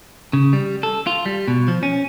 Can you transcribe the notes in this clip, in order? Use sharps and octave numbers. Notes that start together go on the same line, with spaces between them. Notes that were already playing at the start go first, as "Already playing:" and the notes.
C#3
G3
A4
F4
G3
B2
F3
C#4